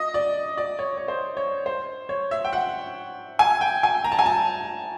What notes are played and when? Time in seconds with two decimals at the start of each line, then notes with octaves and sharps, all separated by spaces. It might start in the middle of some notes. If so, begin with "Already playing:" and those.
Already playing: D#5
0.14 D5
0.57 D5
0.79 C#5
0.97 C#5
1.08 C5
1.37 C#5
1.66 C5
2.09 C#5
2.31 E5
2.45 G5
2.53 F#5
3.39 G#5
3.61 G5
3.83 G#5
4.04 A#5
4.12 A5
4.19 G#5
4.26 A5